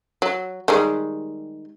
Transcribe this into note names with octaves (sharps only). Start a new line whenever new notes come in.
F#3
D#3 G3 G#3